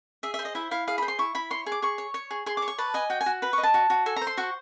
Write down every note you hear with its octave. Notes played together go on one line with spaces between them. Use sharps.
G#4 E5
E5
C5
D#5
E4 E5
E4 F5
G#4 F5
B5
C5
C6
E4 C#6
E4 B5
C#5 C6
G#4
D6
G#4 C#6
C#5
C#5
G#4
G#4 C6
D6
C#5
C#6
B4 A5
D#5 G#5
F#4 G5
G#5
F#4
B4 B5
C#6
D#5
A5
F#4
F#4
A4 G#5
A#5
C5
C6
F#4 C#6